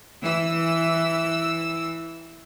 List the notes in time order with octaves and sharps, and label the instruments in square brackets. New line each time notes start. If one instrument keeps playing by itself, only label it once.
[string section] E3 E6